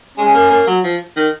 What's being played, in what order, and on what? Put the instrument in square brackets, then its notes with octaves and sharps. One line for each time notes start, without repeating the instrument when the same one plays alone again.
[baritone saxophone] G#3 [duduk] C#4
[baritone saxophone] A#3
A#3
F#3
F3
D#3